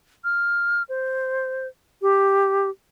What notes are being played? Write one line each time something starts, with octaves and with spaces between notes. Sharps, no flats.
F6
C5
G4